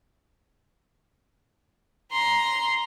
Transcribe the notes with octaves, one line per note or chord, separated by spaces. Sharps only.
A#5 C6